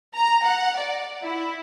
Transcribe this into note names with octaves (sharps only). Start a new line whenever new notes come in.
A#5
F#5
D5
E4